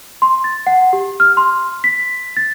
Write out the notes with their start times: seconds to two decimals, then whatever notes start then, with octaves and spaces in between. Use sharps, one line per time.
0.22 C6
0.44 A6
0.67 F#5
0.93 G4
1.20 F6
1.37 C6
1.84 B6
2.37 A6